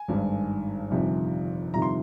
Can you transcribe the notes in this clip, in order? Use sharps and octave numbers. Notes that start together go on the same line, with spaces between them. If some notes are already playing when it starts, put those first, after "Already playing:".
Already playing: G#5
G#1 G2 D#3
G1 F2 C3 D#3
G1 F2 C3 D#3 A#5
C6